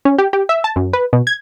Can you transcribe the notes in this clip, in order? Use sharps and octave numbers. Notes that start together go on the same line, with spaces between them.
C#4
G4
G4
E5
A5
F#2
B4
B2
G#6